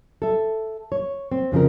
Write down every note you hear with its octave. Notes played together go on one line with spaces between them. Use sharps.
A4 E5
C#5
C4
F2 C#3 F3 A#4